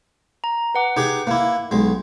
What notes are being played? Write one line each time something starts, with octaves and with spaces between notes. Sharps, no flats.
A#5
B4 F#5 D6
D#4 G4 G#4
A#3 E4
B1 G#3